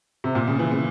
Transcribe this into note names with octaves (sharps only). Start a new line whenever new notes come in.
C3
A#2
C#3
E3
C#3